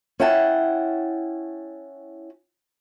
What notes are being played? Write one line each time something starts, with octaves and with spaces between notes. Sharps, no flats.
C#4 E4 F#5 G5 A5